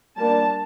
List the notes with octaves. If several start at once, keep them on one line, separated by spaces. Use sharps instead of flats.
G3 A#3 D4 A5